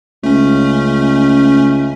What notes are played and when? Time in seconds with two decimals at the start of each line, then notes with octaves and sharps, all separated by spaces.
0.24 C#2 A3 C#4